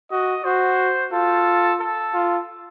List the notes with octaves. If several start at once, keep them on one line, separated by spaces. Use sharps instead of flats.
F#4 D#5
F#4 C5
F4 A4
A4
F4